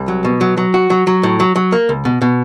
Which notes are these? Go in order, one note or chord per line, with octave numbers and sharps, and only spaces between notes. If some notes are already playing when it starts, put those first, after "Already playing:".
Already playing: C2
F#3
B2
F#3
F#3
F#4
F#3
F#3
A2
F#3
F#3
A#3
C#2
B2
B2